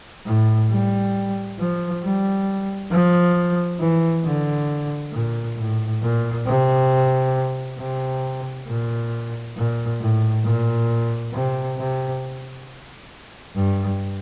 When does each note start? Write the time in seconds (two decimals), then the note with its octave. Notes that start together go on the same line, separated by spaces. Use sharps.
0.26 A2
0.70 G3
1.59 F3
2.03 G3
2.92 F3
3.80 E3
4.25 D3
5.13 A#2
5.58 A2
6.02 A#2
6.46 C3
7.79 C3
8.68 A#2
9.57 A#2
10.01 A2
10.45 A#2
11.34 C3
11.78 C3
13.55 G2